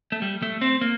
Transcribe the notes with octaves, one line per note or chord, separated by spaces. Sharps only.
A3
G3
A3
C4
A#3